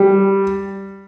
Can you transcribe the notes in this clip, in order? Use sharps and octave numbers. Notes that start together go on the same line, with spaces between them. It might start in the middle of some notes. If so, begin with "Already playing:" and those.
Already playing: G3